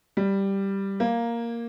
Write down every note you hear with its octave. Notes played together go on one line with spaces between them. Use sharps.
G3
A#3